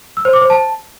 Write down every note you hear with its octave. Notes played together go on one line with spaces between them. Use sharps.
E6
C5
D6
C5
A5